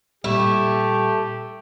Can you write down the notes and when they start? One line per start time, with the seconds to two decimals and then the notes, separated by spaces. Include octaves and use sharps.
0.24 A#2 G3 A3 E4 G4